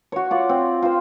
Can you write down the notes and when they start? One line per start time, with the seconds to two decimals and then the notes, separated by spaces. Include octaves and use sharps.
0.12 F#4 C#5
0.31 F4 D5 F#5
0.49 C4
0.82 F4 C5